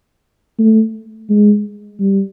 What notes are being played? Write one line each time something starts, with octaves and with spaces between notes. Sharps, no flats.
A3
G#3
G3